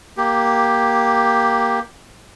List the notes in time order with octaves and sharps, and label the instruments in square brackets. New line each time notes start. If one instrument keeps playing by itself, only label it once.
[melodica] A#3 G4